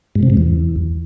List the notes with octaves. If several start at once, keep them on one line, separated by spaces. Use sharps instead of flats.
G#2
C3
G#2
E2